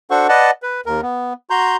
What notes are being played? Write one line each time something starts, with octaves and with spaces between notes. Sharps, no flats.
D4 F#4 A4 C5 F#5 C#6
B4 D5 D#5 F#5 A5
B4
D#2 A#4
B3
F#4 A#5 C6 G6